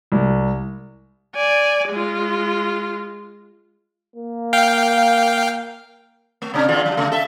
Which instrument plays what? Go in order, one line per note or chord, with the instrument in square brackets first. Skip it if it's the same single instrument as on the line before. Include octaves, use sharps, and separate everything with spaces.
[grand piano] C2
[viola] D5 G#5
G#3 F4
[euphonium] A#3
[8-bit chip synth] F5 G5
[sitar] A3
C3 C#4 D4
E2 D3 F4
F#3
C#3 A3
A4 E5